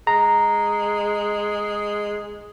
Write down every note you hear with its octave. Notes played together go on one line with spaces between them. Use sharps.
G#3 A#5